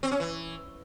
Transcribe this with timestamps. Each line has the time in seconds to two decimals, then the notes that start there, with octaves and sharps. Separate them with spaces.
0.03 C4
0.11 C#4
0.20 E3